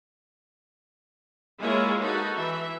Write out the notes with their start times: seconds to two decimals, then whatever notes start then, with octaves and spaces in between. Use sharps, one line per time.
1.60 G#3 A#3 E4 F4 G#4 C#5
2.01 D#4 F#4 A4 B4
2.36 E3 E5